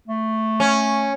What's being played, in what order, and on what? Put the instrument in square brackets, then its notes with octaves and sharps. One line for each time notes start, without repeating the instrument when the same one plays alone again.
[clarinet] A3
[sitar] C#4